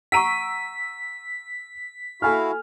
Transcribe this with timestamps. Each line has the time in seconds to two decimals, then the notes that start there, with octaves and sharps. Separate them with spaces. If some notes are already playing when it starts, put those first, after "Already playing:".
0.12 F#5 A#5 C#6 E6 B6 D7 D#7
2.22 E4 F#4 A4 F5 G#5 F6